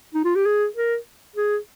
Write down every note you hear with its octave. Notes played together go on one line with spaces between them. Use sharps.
D#4
F4
G4
G#4
A#4
G#4